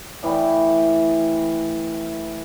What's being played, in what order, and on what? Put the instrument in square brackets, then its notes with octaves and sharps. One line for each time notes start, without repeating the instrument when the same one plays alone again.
[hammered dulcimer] A2 E3 E4 G5